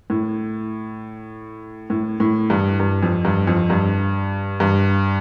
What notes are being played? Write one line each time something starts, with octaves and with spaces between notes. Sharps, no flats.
A2
A2
A2
G2
G2
F2
G2
F2
G2
G2